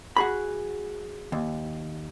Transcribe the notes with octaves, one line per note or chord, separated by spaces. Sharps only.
F#4 G#4 B5
D#2